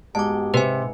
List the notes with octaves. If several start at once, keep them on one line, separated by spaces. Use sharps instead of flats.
G#2 B3 F#4 G4 A5 D6
C3 B4 G#5